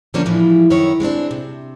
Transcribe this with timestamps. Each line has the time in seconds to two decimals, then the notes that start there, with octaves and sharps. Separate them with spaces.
0.14 D3 F3 G3 A#3 C#4 D4
0.26 A2 E3 F3 G3 G#3
0.70 F#2 D#3 E4 C#5
1.00 G#3 B3 C4 D4
1.31 C3